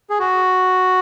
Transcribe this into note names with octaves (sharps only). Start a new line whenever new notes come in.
G#4
F#4